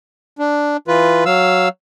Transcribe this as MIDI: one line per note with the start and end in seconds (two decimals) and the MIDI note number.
0.39 0.77 62
0.88 1.24 52
0.88 1.24 65
0.88 1.24 71
1.26 1.68 54
1.26 1.68 77
1.26 1.68 88